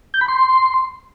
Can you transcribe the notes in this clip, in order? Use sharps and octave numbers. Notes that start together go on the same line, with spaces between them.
G6
B5
C6